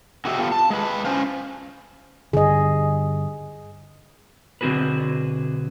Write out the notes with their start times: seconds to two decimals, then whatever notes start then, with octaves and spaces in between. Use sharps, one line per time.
0.25 D3 F#3 F#4 G4 D#5 E5
0.38 B3 F4 G4 A4
0.52 A5
0.70 G#3 B4
1.05 C#4 C5 F5
2.33 G2 D3 G#4 D#5
4.61 B1 D3 C4 F#4 G#4 B4